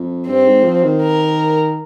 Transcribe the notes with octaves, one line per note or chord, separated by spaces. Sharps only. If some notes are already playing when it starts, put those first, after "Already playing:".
Already playing: F2
G2 C4
G#2
F3
D#3
A#4